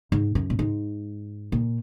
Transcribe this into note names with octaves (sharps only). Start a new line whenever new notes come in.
G#2
F#2
A#2
G#2
A#2